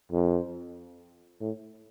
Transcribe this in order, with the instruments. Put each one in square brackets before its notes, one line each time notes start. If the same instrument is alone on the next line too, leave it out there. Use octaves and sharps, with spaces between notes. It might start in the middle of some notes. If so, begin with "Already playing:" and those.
[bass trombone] F2
A2